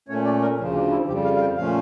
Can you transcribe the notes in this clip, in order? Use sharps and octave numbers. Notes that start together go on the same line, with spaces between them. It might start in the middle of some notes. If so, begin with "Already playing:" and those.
A#2 A3 C#4 C#5
D5
A#4
D2 C#3 F3 C#4
D4
E4
F2 C#3 G3 G4
F5
F5
G5
A#2 F3 A3 C#4 F5